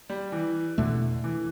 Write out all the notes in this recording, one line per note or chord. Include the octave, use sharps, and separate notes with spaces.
G3
E3
E2 B2 D3 A3
E3